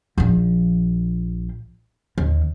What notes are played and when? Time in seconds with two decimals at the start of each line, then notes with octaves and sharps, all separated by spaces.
0.18 A#1 F3
2.18 D#2